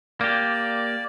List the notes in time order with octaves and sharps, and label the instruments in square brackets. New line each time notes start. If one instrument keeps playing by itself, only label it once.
[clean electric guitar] A#3 G4 [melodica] D5